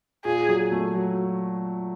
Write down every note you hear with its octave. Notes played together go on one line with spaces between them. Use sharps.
A#2 G#4
F#3
A3
F#3